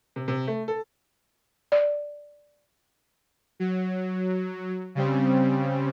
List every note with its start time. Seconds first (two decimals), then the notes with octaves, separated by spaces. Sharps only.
0.16 C3
0.28 C3
0.47 A3
0.68 A4
1.72 D5
3.60 F#3
4.95 C#3 G3 C4